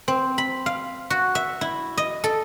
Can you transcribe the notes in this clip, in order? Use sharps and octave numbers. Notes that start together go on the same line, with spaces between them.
C4
B5
F5
F#4
E5
E4
D#5
A4